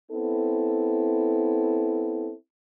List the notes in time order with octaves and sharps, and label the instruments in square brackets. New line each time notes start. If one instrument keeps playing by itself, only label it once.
[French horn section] B3 C4 E4 A4